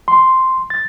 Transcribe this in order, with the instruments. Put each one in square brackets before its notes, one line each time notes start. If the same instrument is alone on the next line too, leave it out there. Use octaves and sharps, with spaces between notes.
[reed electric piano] C6
A6